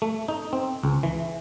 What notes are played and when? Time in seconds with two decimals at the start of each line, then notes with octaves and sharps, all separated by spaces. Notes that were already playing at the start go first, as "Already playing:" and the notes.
0.02 A3
0.28 D#4
0.53 C4
0.83 C#2
1.03 E3